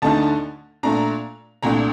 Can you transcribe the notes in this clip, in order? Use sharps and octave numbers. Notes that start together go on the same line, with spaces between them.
D2 D3 A3 D#4 A5
A#2 A3 D4 A#5
C2 A#2 A3 D4 A#5